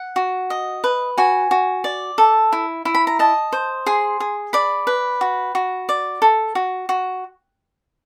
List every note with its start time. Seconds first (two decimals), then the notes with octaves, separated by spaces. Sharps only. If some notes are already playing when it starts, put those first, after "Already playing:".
Already playing: F#5
0.16 F#4
0.50 D#5
0.84 B4
1.18 F#4 G#5
1.51 F#4
1.84 D5
2.18 A4
2.52 E4
2.85 E4
2.95 B5
3.07 A#5
3.19 D#5 A5
3.52 C5
3.86 G#4 C6
4.20 G#4
4.53 D5 B5
4.87 B4
5.21 F#4
5.55 F#4
5.89 D5
6.22 A4
6.55 F#4
6.89 F#4